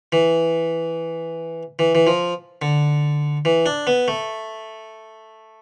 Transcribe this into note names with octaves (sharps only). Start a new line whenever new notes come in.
E3
E3
E3
F3
D3
E3
D4
B3
A3